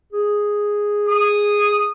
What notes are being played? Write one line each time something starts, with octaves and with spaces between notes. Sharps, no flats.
G#4
D#6